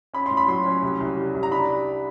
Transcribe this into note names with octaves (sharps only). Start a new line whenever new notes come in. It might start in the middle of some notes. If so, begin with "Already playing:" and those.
C#4 B5
C6
A2
B5
F#3 C6
C#4
C2
C2
G3
C2
A#5
D4 B5